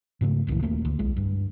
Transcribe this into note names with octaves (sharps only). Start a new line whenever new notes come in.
G#2 C#3 G#3 A3
F1 C#2 A#2 E3
D#1 A3 A#3
D2
B1 G#3
G2